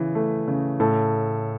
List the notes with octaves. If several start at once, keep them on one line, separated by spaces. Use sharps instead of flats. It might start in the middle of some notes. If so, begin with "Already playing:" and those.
Already playing: C#3 E3
A3
C#3
A2 A4